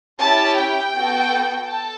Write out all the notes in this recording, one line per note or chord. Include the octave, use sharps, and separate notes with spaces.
C#4 E4 G4 A5
G5
B3 F#4 A4
A4 A5